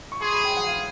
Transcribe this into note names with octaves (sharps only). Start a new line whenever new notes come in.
C#6
G#4 C6
B5
G5
F#5
F5